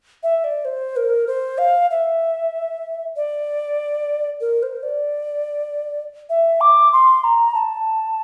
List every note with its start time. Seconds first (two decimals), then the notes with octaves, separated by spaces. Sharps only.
0.23 E5
0.44 D5
0.65 C5
0.96 A#4
1.27 C5
1.58 F5
1.91 E5
3.16 D5
4.41 A#4
4.63 C5
4.83 D5
6.29 E5
6.61 D6
6.93 C6
7.24 A#5
7.55 A5